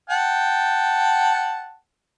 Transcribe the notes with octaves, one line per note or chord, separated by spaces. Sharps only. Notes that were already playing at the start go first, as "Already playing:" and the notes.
F#5 G5 A5